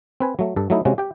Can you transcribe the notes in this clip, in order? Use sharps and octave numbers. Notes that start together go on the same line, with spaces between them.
C4 B4 G#5
F#3 A3
G2 A4
F#3 A3 D#4 E4
C3 G#3 C#4 F#4
G4 G5